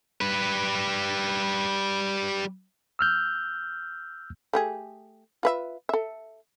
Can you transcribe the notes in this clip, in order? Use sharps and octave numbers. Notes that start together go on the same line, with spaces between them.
G3 B4
E6 F6 G6
A3 G4 G#4
F4 B4 E5
A4 E5